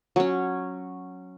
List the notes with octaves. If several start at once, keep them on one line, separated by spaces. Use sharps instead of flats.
F#3 C#4